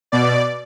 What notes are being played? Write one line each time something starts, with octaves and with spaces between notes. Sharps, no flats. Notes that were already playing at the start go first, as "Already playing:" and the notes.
B2 D5